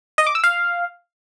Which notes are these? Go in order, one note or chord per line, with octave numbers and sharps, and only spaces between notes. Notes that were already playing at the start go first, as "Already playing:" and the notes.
D#5
D6
E6
F5